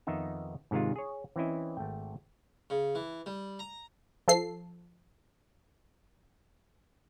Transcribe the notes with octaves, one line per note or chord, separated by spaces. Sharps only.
F2 D#3 B3 D#4 E5
G#2 C3 D#3 G#3 F4
G#4 C#5
E3 C4 C#4 E4 D#5
G#1 A3 G5
C#3
E3
G3
A#5
F3 A4 C7